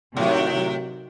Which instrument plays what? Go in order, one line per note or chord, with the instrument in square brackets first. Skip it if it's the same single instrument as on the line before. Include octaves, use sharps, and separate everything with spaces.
[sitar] A2 [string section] C3 D#3 F#3